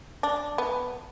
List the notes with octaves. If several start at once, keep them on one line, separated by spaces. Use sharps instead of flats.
D4
B3